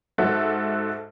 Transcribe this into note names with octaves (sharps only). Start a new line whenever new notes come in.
G#2 F#4 A4 E5